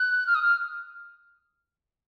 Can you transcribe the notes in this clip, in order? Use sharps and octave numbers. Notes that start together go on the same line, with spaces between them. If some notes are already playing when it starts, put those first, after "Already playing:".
Already playing: F#6
F6
D#6
F6